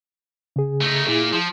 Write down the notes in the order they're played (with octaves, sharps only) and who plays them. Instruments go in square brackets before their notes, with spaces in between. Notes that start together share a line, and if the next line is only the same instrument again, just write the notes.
[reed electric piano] C#3 G#4
[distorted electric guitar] A3 D#4
[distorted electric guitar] A#2 [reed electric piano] E4 G#4
[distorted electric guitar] F3